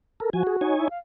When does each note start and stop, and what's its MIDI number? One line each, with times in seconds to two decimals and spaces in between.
0.20 0.30 69
0.20 0.30 70
0.33 0.43 53
0.33 0.76 66
0.33 0.43 80
0.47 0.56 68
0.61 0.88 63
0.61 0.88 73
0.61 0.88 80
0.78 0.88 64
0.90 0.98 77